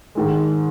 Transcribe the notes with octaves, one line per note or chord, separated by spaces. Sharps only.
G#2 D#3 G#3